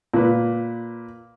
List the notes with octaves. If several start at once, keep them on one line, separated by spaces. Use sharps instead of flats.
A#2 B4